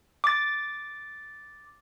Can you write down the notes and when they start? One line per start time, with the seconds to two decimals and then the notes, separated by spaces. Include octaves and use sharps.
0.24 D6 A6